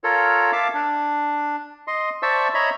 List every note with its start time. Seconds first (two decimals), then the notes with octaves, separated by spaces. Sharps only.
0.04 F4 A4 A#4 C#5
0.53 E5 F5 A5 D6
0.74 D4
1.87 D#5 C6
2.23 C5 D5 E5 A5 C#6 E6
2.54 C#5 D#5 E5 A#5 B5